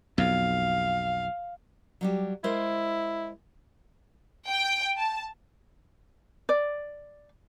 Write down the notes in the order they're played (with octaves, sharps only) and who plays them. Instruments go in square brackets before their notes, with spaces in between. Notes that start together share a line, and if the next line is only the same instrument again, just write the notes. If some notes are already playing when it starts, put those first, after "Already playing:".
[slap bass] B1 F2 [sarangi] F5
[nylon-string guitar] F#3 G3 G4
[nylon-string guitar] G#3 A#4 C5 [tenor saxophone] E4
[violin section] G5
A5
[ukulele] D5